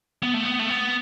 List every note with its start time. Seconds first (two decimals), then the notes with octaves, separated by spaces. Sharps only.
0.23 B3
0.34 A3
0.45 B3
0.59 A3
0.70 B3